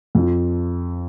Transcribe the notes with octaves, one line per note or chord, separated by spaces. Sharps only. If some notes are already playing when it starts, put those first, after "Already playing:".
F2 F3